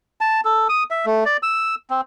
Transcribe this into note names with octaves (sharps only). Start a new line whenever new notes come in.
A5
A4
D#6
E5
A3
D5
E6
C4